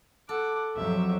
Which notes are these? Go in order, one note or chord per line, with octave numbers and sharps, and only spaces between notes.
A4 F#5 D6
F2 F#3 G4 E5